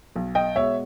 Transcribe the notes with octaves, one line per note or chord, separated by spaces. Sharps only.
B1
D#5 G5
B2 G#3 C#5 E5